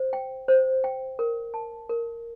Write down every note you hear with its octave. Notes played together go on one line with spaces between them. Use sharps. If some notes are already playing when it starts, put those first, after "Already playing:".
Already playing: C5
G5
C5
G5
A#4
A5
A#4